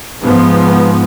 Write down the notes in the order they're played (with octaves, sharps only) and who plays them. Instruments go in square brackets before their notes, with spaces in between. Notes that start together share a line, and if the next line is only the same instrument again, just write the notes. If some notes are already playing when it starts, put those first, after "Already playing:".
[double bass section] G#2 F3 B3